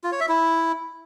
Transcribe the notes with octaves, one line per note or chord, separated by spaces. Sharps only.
F4
C#5
E5
E4